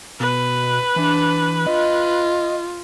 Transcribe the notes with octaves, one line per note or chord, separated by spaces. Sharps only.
B2 B4
E3 D4
F4 D#5